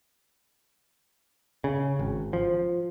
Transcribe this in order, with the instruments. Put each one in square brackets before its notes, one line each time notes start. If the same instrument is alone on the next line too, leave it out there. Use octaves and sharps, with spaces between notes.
[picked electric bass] C#3
G#1
F3